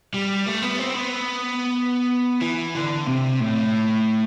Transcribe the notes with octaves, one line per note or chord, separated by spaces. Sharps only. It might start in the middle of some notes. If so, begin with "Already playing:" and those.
G3
A3
B3
C4
B3
E3
D3
C3
A2